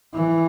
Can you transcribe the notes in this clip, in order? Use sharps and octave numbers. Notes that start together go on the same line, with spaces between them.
E3